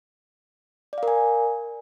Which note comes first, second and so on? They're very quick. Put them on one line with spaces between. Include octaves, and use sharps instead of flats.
D5 F5 A#4 G#5